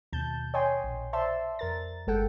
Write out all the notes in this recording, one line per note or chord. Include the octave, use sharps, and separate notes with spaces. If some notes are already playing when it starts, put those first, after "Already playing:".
D#2 B2 A5 G6
C#5 D#5 G5 G#5 C6
A#1
C5 D5 E5 A5 C6
F2 A#4 A6
G1 G#3 A4 F#5 G5